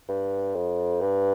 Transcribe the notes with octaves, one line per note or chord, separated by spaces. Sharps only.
G2
F2
G2